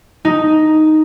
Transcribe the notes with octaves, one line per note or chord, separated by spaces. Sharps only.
D#4